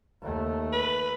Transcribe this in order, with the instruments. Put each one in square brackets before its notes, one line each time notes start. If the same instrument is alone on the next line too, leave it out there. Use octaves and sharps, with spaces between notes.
[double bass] D#2 A3
[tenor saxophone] B4